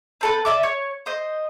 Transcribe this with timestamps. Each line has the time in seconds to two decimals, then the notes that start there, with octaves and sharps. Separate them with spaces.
0.21 C4 A4 B4
0.45 D5 E5 D6
0.63 C#5
1.06 C5 D#5